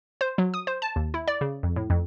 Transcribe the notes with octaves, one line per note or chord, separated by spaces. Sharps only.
C5
F#3
D#6
C5
A5
D#2
E4
D5
C#3
F2
A2
F2